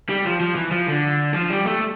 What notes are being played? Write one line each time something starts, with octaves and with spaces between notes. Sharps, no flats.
G3
F3
F3
E3
F3
D3
F3
G3
A3